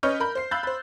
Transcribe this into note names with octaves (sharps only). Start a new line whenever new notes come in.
C#4 B4 C#5 D#5 F6 G6
A#4 B5 G6
C5 C7
F5 B5 E6 F#6 G6 A6
C5 B5